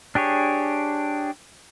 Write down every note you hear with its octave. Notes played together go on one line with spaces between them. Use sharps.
D4 G4 G#4 C#5